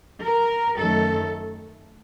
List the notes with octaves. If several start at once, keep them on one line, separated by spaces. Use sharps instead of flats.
A#4
F#2 D#3 A3 A4